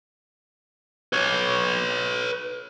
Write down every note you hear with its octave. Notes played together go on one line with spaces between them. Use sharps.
B4 C#5